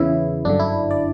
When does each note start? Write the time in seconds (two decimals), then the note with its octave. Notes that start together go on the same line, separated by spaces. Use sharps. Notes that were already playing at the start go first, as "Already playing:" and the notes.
Already playing: E2 C#3 E3 E4
0.45 G1 F#2 D3 D4
0.59 E4
0.91 D5